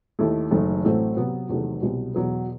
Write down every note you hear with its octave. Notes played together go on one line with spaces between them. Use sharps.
D#2 D#3 A3 E4
F#1 F#2 D#3 A3
A1 A2 F#3 A3 C4
C3 F#3 B3
E2 C3 D#3 F#3 A3
C2 B2 F#3
E2 B2 F#3 B3